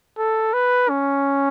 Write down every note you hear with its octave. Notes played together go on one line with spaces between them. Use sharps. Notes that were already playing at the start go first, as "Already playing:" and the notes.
A4
B4
C#4